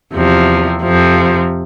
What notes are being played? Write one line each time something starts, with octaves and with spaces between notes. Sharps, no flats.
E2 C3 F3
F2 C3 F3